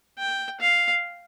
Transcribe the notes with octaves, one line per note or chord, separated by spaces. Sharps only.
G5
F5